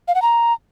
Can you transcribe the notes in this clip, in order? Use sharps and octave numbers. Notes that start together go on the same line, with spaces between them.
F5
F#5
A#5